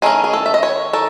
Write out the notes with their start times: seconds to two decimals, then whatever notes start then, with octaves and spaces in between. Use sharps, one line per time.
0.02 D#3 A3 C#4 G#4
0.24 G#4
0.33 A4
0.46 E5
0.54 D#5
0.63 C#5
0.93 D#3 A4